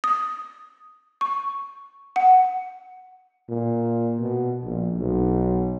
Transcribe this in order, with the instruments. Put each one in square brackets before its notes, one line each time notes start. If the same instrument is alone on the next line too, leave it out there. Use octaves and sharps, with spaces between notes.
[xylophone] D#6
C#6
F#5
[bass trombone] A#2
B2
A#1
B1